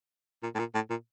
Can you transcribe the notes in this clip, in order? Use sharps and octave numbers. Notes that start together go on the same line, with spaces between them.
A#2
A2
A#2
A2
A#2